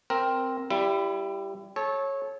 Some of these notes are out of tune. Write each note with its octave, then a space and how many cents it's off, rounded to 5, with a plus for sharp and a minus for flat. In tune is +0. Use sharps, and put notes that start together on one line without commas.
C4 +0 A#4 +0
G3 +0 E4 +30
A4 -30 C#5 -15